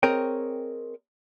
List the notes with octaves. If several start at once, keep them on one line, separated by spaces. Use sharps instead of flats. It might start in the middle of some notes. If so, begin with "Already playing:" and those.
C4 G#4 A#4 C#5 D#5 G5